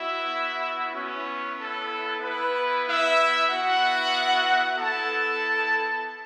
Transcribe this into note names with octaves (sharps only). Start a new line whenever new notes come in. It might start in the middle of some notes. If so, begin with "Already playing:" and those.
Already playing: B3 E4 F#4 E5
B3 C#4 E4 C#5
A4
B3 E4 B4
E4 E5
B3 E4 F#4 F#5
B3 E4 A4 A5